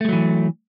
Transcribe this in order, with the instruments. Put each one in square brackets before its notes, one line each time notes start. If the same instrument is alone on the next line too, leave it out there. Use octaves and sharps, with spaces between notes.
[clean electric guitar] A3
G#3
F#3
E3